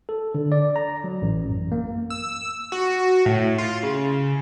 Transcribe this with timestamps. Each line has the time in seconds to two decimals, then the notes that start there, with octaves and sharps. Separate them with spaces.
0.09 A4
0.35 D3
0.52 D5
0.76 A#5
1.04 F#3
1.22 A1
1.50 F#2
1.72 A#3
2.10 E6
2.72 F#4
3.25 A2
3.58 F4
3.83 C#3